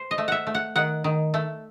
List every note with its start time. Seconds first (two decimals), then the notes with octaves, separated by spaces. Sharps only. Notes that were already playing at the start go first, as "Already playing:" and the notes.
Already playing: C5
0.11 D#5
0.18 A3
0.28 E5 F#5
0.47 A3
0.55 F#5
0.76 D#3 F#5
1.04 D#3
1.34 A3